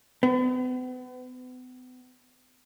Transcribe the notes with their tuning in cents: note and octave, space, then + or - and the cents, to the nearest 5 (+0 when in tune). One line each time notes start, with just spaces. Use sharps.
B3 +40